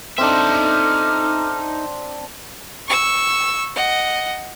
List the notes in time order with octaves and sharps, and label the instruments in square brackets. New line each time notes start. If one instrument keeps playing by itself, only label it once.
[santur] C4 D4 [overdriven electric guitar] D#4 E5 [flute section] A4 D6 F6
[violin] C#6 E6
D#5 F#5